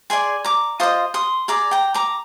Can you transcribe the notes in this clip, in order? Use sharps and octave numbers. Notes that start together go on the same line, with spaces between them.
G#4 D5 G#5 C6
A#5 D6
F4 C5 D#5 C6 D#6
C6 D#6
G#4 D5 A#5 D6
G5 A#5
A#5 D6